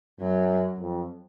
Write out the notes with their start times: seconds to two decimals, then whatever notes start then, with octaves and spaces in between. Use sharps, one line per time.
0.20 F#2 F#3
0.80 F2